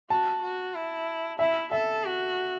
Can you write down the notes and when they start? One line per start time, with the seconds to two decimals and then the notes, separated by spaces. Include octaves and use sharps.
0.10 F#4 A5
0.42 F#4
0.74 E4
1.39 E4 E5
1.71 A4 E5
2.04 F#4